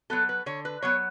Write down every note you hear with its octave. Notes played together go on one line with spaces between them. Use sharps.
F#3 B3 A4
B4
D3 C#5
B4
F#3 B3 C#5